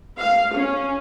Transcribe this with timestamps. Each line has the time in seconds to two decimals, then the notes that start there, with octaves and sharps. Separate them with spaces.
0.19 F5
0.55 C#4